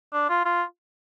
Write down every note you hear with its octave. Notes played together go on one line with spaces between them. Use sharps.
D4
F4
F4